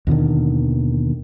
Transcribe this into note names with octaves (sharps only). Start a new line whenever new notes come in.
D#2 B2 D3 D#3